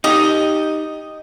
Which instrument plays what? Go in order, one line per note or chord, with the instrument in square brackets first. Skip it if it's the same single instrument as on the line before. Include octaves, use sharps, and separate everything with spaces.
[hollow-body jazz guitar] D#4 G4 [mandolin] D#5